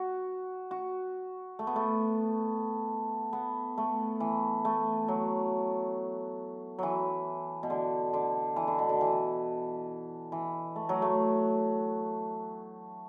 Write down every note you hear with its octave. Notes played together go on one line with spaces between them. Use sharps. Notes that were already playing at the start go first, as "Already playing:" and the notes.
Already playing: F#4
F#4
A3
B3
A3
B3
A3
E3
A3
F#3
E3 F#3
B2
D3
D3
E3
D3
B2
D3
E3
E3
A3
F#3
A3